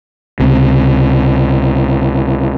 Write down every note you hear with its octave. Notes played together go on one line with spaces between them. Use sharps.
C#2 C3